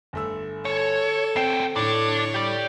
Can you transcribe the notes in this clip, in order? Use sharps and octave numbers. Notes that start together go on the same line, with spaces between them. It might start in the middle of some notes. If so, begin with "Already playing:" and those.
G1 A3 E6
A4 C#5
D2 C4 G5 C7 E7
A2 D3 D4 C#5
G4 D5